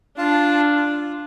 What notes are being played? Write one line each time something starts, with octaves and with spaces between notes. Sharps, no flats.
D4 F4 F5 A5
F4